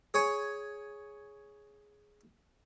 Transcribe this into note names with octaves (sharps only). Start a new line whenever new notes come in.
G#4 C#5 G#5 C#6